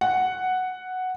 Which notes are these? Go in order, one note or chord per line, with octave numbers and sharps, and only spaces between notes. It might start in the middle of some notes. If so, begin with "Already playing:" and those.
F#5